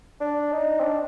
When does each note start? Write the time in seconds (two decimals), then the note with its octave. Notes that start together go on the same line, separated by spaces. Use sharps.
0.21 D4
0.52 D#4
0.79 C4
0.83 D4